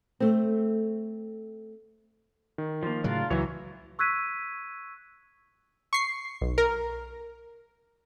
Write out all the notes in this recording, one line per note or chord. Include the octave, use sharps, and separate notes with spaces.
A3 C4
D#3
F3 A#3
A2 C#3 F#3 D4 F4 A#4
C#2 E3 F#3 C#5 E5 A#5
C#6 E6 F#6 G#6 B6 D#7
C#6 C7
B1
A#4